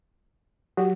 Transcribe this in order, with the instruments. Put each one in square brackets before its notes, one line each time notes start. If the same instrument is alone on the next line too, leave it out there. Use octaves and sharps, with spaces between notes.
[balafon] F#3 [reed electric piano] F#4 G4